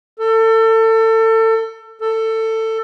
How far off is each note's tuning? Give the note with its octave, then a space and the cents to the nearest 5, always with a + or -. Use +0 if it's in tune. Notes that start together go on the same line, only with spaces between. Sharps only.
A4 +30
A4 +20